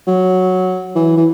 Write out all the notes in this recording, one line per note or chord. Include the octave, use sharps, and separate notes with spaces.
F#3
E3
E3